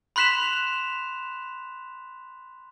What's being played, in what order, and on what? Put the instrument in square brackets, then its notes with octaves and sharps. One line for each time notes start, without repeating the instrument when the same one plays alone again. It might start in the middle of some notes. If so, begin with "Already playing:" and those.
[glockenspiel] B5 C6 F#6 B6 E7 F7